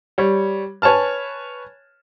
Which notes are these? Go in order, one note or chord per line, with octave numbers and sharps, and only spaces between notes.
G3 C#5
B4 C#5 G#5 A5 F6